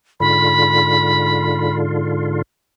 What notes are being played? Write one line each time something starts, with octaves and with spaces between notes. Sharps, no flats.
G#2 D3 F4 B5